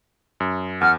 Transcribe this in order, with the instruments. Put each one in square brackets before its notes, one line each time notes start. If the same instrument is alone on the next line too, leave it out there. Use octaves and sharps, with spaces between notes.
[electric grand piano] F#2
[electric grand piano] E2 [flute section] F#5 F6